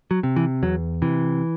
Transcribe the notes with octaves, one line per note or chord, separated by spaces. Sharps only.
F#3
C3
E3
E2 F#3
C3 E3